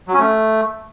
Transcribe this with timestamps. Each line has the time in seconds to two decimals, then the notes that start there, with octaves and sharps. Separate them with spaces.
0.08 F#3
0.14 C#4
0.20 A3